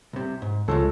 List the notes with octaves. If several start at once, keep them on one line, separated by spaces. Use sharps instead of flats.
C2 C3
G#2
C#2 C#3 F3 G#3 A4